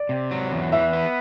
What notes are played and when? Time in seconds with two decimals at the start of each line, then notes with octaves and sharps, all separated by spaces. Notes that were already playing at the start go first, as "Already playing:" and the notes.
Already playing: D5
0.09 C3
0.31 F#3
0.52 E2
0.72 E3 E5
0.93 B3